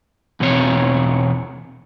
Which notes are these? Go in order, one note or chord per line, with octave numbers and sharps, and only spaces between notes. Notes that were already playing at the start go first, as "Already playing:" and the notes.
E2 B2 C4 C#5